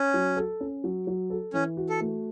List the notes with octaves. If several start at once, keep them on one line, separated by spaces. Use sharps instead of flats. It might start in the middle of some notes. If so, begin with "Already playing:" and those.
Already playing: C#4
F#3
A4
C#4
F#3
F#3
A4
E3 C#4
F#4
A4
A3